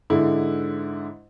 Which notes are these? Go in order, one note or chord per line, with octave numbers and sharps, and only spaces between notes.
G#2 D3 E4